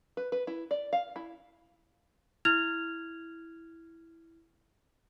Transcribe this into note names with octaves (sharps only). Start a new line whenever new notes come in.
B4
B4
E4
D5
F5
E4
E4 F6 G#6 F7